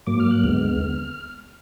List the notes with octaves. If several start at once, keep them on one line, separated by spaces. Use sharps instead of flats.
G#2 F#3 A#3 D6
F6
F#6
D#2 D3 G#3 B3 F6